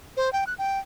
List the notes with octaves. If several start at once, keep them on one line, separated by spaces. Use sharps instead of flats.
C5
G5
F#6
G5